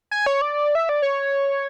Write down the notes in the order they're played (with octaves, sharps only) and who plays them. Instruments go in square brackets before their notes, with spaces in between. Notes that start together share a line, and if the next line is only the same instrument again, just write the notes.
[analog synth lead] G#5
C#5
D5
E5
D5
C#5